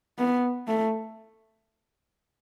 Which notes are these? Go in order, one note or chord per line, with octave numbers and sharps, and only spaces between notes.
B3
A3